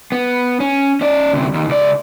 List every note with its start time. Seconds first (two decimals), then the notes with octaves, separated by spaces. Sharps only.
0.12 B3
0.60 C#4
1.01 C#4 D5
1.33 D2 C3
1.54 D#2
1.69 C#2 D5